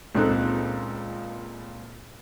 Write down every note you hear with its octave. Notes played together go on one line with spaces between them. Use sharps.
C#2 A#2 C4 D#4 A4 F#6